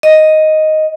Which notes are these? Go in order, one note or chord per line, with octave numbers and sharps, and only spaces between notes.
D#5